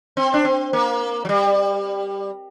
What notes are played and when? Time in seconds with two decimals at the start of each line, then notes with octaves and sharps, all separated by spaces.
0.17 C4
0.34 D4
0.45 C4
0.73 A#3
1.25 F#3
1.29 G3